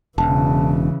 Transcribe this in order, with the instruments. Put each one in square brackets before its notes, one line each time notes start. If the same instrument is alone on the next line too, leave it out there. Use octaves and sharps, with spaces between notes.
[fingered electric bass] E1 [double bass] C#3 E3 [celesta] A5